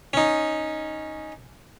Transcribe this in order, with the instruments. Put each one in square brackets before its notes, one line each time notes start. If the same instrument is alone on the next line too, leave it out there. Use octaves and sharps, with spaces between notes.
[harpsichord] C#4 D#4